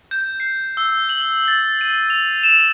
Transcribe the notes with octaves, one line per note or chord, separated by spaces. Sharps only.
G6
C7
E6
F#7
A6
D#7
F7
E7